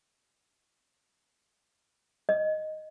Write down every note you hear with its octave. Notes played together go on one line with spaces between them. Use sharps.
D#5